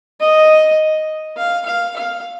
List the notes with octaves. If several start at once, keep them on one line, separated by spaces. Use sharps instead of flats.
D#5
F5
F5
F5